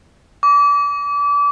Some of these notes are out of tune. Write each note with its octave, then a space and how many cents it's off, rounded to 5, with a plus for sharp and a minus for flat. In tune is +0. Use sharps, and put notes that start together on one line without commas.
D6 -30